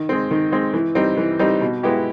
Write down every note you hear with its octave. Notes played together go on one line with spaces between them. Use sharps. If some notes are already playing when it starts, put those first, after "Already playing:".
Already playing: D#3
G#3 C4
D#3
G#3 C4
E3
G3 C4 D#4
E3
G3 C4 D#4
B2
G#3 B3 E4 G4